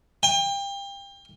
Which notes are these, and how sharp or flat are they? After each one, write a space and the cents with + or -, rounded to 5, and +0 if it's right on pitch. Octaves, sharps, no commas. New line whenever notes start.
G5 +30